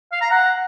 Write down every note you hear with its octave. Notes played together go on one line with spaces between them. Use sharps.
F5
A#5
F#5